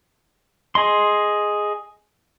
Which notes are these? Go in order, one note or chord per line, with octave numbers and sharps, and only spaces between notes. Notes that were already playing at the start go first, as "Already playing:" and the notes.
G#4 D#5 C6